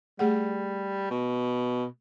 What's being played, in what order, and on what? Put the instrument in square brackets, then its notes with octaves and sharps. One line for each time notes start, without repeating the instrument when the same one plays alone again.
[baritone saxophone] G3 [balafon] A3 G#4 F#5
[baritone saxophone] B2